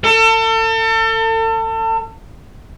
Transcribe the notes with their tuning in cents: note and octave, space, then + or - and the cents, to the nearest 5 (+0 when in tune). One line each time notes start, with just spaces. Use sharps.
A4 +35